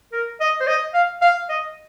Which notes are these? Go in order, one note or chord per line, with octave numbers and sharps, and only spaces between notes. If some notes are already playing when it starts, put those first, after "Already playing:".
A#4
D#5
C5
D#5
F5
F5
D#5